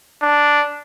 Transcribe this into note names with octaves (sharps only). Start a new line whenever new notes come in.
D4